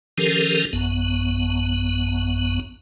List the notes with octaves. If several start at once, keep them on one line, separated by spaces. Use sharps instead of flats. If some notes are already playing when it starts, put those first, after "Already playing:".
D#3 F3 C#4 G4 A4 A#4
A1 F#2 B3